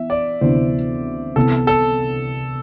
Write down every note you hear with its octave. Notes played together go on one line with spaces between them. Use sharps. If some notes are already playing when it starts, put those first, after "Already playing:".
Already playing: E3 B3 E5
D5
D2 C3 E3 B3 C5
C2 C3 E3 B3 A4
A4